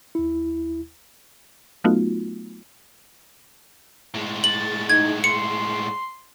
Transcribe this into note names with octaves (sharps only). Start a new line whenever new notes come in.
D#2 E4
F#3 A3 B3 D#4 F4 F#4
A2 G#3
A6 F#7
D#4 G#6
C6 C#7